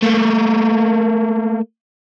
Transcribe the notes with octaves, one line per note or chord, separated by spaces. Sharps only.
A3 A#3